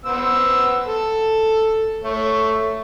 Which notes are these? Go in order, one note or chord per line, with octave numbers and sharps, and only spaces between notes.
B3 C5 E6
A4
A3 C#5